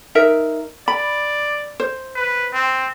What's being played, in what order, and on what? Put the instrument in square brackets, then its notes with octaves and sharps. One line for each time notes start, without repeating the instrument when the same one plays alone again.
[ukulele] D#4 A#4 E5
[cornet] D5 [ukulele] B5
[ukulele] C5
[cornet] B4
C4